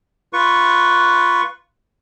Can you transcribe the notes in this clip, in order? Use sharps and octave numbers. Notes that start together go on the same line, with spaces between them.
F4 B4 C#6